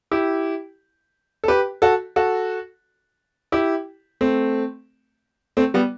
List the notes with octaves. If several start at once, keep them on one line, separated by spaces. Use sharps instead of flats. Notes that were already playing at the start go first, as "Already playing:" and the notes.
E4 G4
A4
G4 B4
F#4 A4
F#4 A4
E4 G4
A3 C4
A3 C4
G3 B3